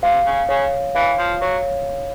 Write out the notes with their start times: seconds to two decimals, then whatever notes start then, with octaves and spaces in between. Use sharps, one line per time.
0.03 C3 F5
0.26 C#3
0.49 C#3 C#5
0.95 E3 F5
1.18 F3
1.41 F#3 C#5